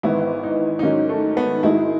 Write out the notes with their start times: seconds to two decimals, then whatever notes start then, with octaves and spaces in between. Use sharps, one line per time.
0.03 G#1 G#2 E3 B3 E4
0.43 D#4
0.79 D#4
0.83 G#2 D#3 F#3 C#4
1.09 A3
1.37 B3
1.63 G#2 D#3 G#3 D#4 E4 F#4